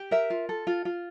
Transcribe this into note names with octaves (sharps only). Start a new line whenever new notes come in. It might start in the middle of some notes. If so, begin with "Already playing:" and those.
Already playing: G4
A#4 E5
F4
A4
F4
F4